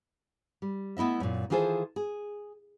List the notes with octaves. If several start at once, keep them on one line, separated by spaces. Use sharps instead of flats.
G3
A3 B3 E4 D#5 E5
F#2 A#2
D#3 E3 F4 G#4 A4 C5
G#4